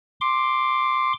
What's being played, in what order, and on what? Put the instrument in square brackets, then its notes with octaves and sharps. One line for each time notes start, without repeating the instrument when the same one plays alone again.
[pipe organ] C6 D6